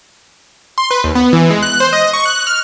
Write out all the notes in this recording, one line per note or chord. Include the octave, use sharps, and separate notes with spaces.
C6
B4
D#2
B3
E3
G#3
F#6
C5
D#5
C#6
F#6
F6